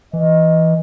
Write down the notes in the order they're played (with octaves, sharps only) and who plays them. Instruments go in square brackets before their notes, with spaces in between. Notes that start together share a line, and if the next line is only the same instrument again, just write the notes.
[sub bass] E3 [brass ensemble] D#5